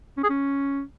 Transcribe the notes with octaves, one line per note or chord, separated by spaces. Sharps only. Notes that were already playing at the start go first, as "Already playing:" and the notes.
C#4
G#4
C#4